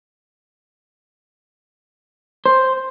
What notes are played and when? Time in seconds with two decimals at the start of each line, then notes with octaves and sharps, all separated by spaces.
2.46 C5